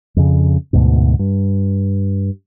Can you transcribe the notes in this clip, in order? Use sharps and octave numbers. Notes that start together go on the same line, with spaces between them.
F2 C#3
D2 G#2 B2
G2